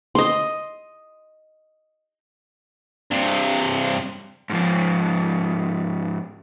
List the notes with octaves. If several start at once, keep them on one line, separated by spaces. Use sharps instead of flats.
D#5 C6
G2 C3
G#2 F3